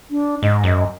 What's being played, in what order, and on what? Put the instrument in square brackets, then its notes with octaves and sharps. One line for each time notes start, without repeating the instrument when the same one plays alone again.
[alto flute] D4
[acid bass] G#2 [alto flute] D#5
[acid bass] F#2